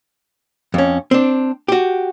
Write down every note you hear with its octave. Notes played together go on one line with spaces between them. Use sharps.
F2 C#4
C4 D4
F#4 G4